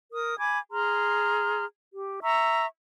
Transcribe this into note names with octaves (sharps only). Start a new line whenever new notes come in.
A#4 D#6
G#5 B5 D6 G#6
G#4 A#5 C6 F6
G4
E5 A#5 C#6 E6